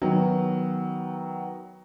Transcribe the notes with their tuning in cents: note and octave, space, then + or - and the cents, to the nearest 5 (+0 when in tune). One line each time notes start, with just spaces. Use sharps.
D#3 +15 F#3 +5 B3 +0